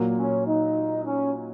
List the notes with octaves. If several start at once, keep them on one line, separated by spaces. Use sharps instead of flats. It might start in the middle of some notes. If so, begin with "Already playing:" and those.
Already playing: A#2 F#3 A#3
C#4
D#4
C#4